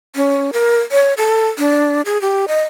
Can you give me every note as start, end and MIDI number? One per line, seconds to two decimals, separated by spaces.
0.16 0.51 61
0.53 0.78 70
0.92 1.14 73
1.17 1.46 69
1.59 2.02 62
2.05 2.20 68
2.22 2.46 67
2.48 2.62 75